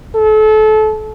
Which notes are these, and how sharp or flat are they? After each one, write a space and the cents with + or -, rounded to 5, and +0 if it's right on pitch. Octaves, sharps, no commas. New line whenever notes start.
A4 -30